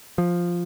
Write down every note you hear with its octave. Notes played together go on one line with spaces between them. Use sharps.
F3